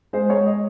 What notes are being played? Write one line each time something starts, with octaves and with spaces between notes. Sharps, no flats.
G#3 C5
G#3 C#5
D#5